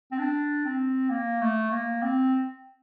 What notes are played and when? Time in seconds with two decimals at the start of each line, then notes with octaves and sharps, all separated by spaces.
0.12 C4
0.19 D4
0.65 C4
1.10 A#3
1.41 A3
1.72 A#3
2.02 C4